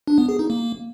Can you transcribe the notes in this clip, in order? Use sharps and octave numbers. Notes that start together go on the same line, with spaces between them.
D4
B3
G#4
D#4
A#3